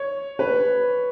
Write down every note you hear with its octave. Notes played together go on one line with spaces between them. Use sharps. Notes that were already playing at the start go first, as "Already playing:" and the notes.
Already playing: C#5
B4